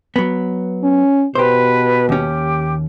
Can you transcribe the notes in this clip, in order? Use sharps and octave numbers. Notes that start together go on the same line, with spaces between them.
F#3 B3
C#4
B2 G4 B4 C5
D#2 C#4 G4